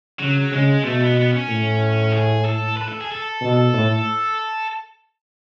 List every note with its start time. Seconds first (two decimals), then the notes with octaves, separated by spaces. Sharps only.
0.19 C#3 F#3
0.52 C#3 G#3
0.84 B2 A3
1.01 B3
1.17 B3
1.32 C#4
1.48 A2
2.12 G#4
2.45 A4
2.77 B4
2.89 A4
3.01 G#4
3.12 A4
3.41 B2
3.74 A2